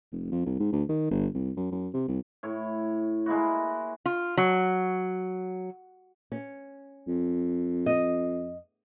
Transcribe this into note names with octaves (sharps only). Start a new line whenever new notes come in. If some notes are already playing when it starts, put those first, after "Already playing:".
F1
F2
C2
G#2
D2
D#3
G1
C2
F#2
F#2
C3
C2
A2 C#5
G#3 A#3 E4 F#4
F4
F#3
C#4
F2
D#5